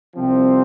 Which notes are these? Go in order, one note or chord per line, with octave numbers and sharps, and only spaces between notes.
C2 C3 F3 C4